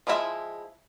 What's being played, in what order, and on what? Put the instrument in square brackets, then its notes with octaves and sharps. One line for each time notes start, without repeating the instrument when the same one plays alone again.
[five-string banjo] F3 G#3 E4 F#4 E5